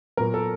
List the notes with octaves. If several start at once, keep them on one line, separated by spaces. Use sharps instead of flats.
A#2 F#3 B3 A#4
A4